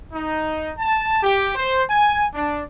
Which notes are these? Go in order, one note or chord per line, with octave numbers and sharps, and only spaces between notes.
D#4
A5
G4
C5
G#5
D4